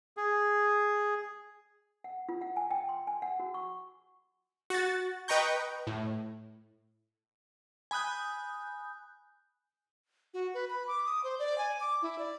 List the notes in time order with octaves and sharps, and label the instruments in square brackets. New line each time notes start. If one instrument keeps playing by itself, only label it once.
[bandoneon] G#4
[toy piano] F#5
F4
F#5
G#5
G5
C6
G#5
F#5
F#4
C#6
[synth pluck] F#4 A6
B4 D#5 G5 A#5 C#6 G6
A2
[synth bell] G#5 B5 D#6 F#6 G6
[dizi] F#4
B4
B5
D6
D#6
C5
D5
G#5
D6
E4
D5